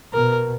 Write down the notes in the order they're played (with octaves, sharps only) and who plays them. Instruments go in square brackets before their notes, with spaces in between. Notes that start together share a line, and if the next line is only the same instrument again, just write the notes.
[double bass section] B2 [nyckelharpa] A#4